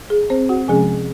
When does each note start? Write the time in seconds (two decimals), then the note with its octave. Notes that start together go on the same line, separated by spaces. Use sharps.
0.10 G#4
0.30 C4 C5
0.49 F#4 F#5
0.68 C3 F3 G#3 C#4 G#4 G#5